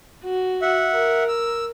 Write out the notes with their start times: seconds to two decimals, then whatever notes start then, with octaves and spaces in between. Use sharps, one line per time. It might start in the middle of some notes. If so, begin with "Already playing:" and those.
0.24 F#4
0.62 E5 F#5
0.93 A#4
1.28 E6